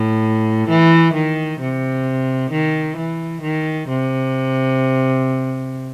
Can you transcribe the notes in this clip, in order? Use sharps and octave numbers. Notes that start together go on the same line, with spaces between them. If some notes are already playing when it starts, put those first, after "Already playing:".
Already playing: A2
E3
D#3
C3
D#3
E3
D#3
C3